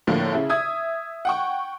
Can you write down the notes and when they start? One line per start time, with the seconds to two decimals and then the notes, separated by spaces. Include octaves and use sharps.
0.07 A2 D3 F3 A#3
0.33 C#3 E4
0.49 E5 D#6 G#6
1.25 F#5 G5 C#6